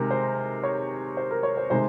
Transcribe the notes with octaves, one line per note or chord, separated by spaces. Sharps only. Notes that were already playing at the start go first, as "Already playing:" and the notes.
Already playing: C3 D#3 G#3 A#4
C5
C#5
C5
A#4
C#5
C5
C3 D#3 G#3 C5